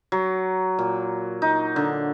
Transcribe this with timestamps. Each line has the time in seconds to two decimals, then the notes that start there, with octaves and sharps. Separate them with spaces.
0.12 F#3
0.79 A#2
1.42 D#4
1.76 D3